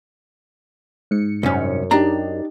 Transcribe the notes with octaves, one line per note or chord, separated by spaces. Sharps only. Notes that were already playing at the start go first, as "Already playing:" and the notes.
G#2 C#7
C2 F#2 C#4
D4 D#4 G4 A#5